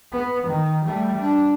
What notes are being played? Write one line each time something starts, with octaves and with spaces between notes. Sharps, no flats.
B3
D#3
G3 A3
D4